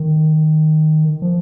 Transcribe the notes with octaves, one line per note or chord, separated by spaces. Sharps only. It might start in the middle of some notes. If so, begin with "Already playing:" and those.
Already playing: D#3
F3